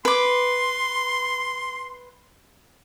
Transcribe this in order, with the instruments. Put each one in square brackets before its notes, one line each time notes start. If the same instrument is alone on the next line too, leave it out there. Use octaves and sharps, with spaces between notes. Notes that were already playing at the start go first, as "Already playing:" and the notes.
[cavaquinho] B4 D6 [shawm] C6